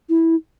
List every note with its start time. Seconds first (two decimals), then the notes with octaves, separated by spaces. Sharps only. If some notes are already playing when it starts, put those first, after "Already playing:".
0.09 E4